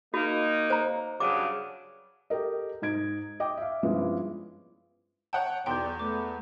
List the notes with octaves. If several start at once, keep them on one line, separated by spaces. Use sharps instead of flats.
A#3 D#4 F#4
C5 A#5
G2 C#3 F#3 D6
G4 A4 A#4 D#5
G#2 D#4 G#6 D7
D#5 G5 D6
E5 F5
G2 F3 G#3 B3 C#4 E4
C#5 F#5 G5 A5
B1 E2 D5 G5 C6 G6
A3 B3 D6